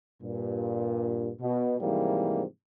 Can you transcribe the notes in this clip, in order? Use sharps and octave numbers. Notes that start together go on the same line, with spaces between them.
G2 A#2
B2
G#2 C3 E3 F3 G3 A#3